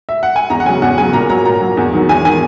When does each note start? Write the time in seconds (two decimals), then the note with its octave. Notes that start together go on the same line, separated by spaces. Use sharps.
0.09 E5
0.23 F#5
0.36 G#5
0.50 E2 A#5
0.60 F#5
0.65 C#3 F#3 G#5
0.82 E2 F#5
0.97 C#3 G#5
1.01 F#3
1.13 A#2 A#5
1.30 F#3 A#5
1.45 A#2 A#5
1.61 F#3
1.77 E2
1.93 D#3 F#3
2.09 E2 G#5
2.25 D#3 F#3 G#5